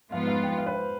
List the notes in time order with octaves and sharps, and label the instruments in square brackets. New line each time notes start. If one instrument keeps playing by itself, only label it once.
[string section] G#2 F3 B3 F4 [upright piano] F5
[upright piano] F5
G5
F5
B4
C5